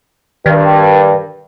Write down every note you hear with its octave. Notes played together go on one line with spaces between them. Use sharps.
G2 D#3